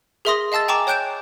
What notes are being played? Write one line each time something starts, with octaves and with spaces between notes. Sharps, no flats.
G#4 A#4 E5 C6 D#6 A#6
D#5 F5 A5 E6 A6
G5 G#5 A#5 C#6 D6 E7
C#5 G5 F#6 G6 D7 E7